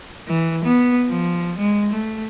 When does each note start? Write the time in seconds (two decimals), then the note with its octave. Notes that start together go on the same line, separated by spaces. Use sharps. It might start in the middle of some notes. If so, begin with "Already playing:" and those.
0.28 E3
0.65 B3
1.08 F3
1.58 G#3
1.92 A3